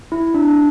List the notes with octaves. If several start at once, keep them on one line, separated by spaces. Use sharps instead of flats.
E4
D4
D4